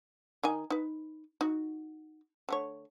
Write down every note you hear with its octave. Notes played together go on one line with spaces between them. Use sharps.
D#3 D#4 G#5
D#4 B4
D#4 F#4
D3 A3 C#5